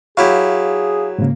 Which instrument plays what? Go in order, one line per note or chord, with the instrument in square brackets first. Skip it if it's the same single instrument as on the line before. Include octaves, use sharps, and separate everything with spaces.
[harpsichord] F#3 E4 G4 [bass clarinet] G#4 [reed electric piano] F5
[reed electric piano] G#2 C#3 [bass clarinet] A#3